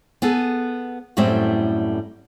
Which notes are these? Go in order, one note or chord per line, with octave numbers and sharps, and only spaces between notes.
B3 G#4 A4
F#2 A2 G3 A3 C4